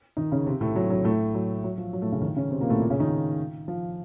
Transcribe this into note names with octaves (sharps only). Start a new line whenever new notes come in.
D#3 D#4
C#3 C#4
C3 C4
A2 A3
F#3
F#3
A2 A3
F#3
F#3
F3
F#3
A2 A3
C#3 C#4
D#3 D#4
C#3 C#4
C3 C4
A#2 A#3
A2 A3
A#2 A#3
C#3 C#4
D#3 D#4
F3